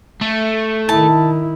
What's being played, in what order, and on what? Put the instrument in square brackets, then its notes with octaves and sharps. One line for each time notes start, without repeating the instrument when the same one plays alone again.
[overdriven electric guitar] A3
[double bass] D#3 E4 [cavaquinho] A5